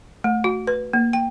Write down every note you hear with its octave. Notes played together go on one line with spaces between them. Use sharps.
A3
F#4
B4
A#3
G5